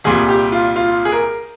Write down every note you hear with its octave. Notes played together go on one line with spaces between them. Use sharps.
C2 A#2 G3 G#4
G4
F4
F4
G#4
A#4